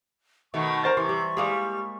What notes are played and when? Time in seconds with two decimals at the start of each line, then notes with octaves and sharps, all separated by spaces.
0.54 B2 D#3 A3 C#6
0.84 A#4 C5 A6
0.97 C3 E3 C6
1.09 G3
1.37 G3 G#3 A#3 G#4